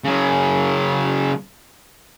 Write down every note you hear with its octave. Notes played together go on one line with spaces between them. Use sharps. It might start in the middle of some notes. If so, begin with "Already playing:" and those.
C#3 F#3